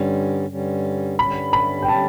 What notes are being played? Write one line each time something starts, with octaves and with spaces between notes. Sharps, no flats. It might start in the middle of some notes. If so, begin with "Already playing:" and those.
Already playing: G2 D3 G3 C#4
G2 D3 G3 C#4
G2 D3 G3 C#4 B5
B5
G5
D3 G3 C#4 A5